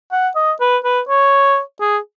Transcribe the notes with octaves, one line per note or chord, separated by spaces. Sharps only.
F#5
D#5
B4
B4
C#5
G#4